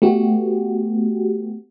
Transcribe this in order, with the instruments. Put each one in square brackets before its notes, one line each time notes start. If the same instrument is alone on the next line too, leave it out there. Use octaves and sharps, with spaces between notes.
[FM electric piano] A3 B3 F#4 G4